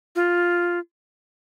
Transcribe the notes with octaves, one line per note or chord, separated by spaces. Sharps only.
F4